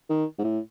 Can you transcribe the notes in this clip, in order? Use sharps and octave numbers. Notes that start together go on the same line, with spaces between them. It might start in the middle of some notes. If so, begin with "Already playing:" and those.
D#3
G#2
A2